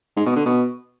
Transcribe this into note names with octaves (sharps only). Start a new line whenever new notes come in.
G#2
B2
D3
B2